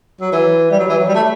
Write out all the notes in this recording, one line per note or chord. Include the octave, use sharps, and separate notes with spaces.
F#3
E3
G3
F#3
E3
F#3
G3
A3